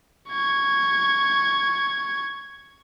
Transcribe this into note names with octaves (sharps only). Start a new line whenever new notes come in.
C#6 G#6